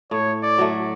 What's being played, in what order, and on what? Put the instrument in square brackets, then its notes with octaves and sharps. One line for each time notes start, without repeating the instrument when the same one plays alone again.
[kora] A2 [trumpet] C#5
[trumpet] D5
[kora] F#3 A3